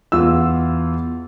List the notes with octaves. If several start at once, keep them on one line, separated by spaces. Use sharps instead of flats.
E2 F4 E6